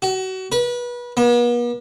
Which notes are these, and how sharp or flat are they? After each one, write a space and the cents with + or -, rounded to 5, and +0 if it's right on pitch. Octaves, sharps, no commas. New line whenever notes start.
F#4 +30
B4 -30
B3 -45